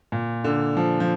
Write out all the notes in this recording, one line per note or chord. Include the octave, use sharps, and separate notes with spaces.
A#2
D3
F3
F3